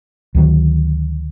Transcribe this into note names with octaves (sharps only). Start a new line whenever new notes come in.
D2 D#3 F#3